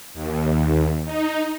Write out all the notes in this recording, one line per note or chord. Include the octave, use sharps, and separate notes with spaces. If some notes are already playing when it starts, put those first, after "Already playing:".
D#2
D#4